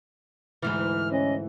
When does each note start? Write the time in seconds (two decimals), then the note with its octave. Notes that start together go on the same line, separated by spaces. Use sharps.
0.62 D2 G#2 E3 F6
1.12 C#4 D#5